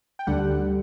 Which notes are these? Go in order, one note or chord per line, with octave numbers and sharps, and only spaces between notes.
G5
D2 D3 G3 F#5